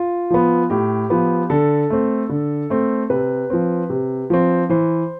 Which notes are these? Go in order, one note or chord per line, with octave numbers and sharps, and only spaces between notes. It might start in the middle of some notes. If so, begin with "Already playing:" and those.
Already playing: F4
F3 B3
A2 G4
F3 B3
D3 A4
A3 C4
D3
A3 C4
C3 B4
F3 C4
C3
F3 C4
E3 C5